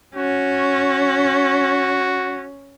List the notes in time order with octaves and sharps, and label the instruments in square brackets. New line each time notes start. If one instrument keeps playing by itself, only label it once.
[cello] C#4 [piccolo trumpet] F#4